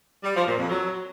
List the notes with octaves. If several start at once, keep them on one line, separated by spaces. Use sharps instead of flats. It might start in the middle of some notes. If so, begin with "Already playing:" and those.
G3
F3
A#2
F2
F#3